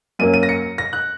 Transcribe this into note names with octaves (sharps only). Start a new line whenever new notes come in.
F#2 F#3 A#3 C#4 D#7
D#7
A#6
C#7
A#6
F#6